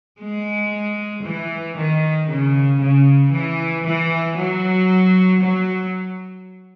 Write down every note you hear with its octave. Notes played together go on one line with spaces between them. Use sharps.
G#3
E3
D#3
C#3
C#3
E3
E3
F#3
F#3